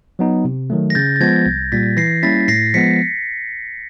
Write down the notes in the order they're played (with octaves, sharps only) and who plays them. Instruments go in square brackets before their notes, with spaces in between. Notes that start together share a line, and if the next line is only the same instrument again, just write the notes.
[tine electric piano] F#3 B3 D#4
C3
D#3 F#3 A3
[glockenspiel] A#6
[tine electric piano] C#3 [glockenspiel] G6 A6
[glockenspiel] A6
[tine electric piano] F3 G#3 B3 [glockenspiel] G#6 A#6
[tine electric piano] C2
[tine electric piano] A#2 G3 [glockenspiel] A6 B6
[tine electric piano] E3 [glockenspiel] A#6 C7
[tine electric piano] G3 A#3 C#4 E4 [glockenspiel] A6 B6
[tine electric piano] A2 [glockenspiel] A#6 C7
[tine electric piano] F3 G#3 B3 [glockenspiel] B6 C#7